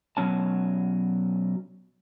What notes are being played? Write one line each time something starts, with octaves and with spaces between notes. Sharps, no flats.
B2 F#3 C#4 A5